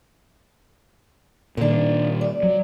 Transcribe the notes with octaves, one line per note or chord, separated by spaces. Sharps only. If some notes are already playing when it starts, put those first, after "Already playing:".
A#2 D#3 A#3 D4
D5
F#3